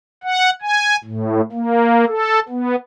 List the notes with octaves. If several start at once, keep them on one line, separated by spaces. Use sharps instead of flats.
F#5
G#5
A2
A#3
A4
B3